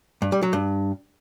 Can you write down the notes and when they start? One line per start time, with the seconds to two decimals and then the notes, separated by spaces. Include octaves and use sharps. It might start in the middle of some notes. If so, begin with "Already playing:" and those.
0.22 G2
0.32 G3
0.43 F#3
0.53 G2